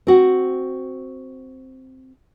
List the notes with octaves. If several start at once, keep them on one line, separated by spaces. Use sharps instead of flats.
C4 F#4